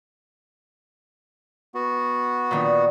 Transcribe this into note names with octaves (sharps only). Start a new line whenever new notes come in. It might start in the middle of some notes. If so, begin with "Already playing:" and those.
B3 F#4
A#2 D#3 D4